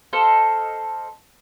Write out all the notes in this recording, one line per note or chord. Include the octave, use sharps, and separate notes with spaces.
A4 C5 D#5 F5